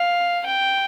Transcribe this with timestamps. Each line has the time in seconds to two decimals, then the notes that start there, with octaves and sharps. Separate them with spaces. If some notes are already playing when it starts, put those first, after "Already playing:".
Already playing: F5
0.46 G5